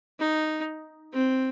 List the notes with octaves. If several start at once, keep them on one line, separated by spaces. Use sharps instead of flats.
D#4
C4